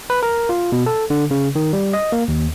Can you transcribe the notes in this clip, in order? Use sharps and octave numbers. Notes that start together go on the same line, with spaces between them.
B4
A#4
F4
B2
A4
D3
C#3
D#3
G3
D#5
A#3
D#2